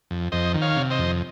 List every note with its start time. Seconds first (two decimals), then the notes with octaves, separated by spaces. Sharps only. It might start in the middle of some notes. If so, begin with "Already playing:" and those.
0.11 F2
0.32 F2 C5 D#5
0.54 D#3
0.61 C#5 F5
0.76 C3
0.91 C5 D#5
0.98 F2